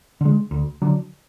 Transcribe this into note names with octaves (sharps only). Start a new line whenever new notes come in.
D3 G#3
D2
D3 F#3 D4